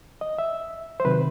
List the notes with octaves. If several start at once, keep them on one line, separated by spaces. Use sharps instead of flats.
D#5
E5
C5
C3 D#3 F#3 B4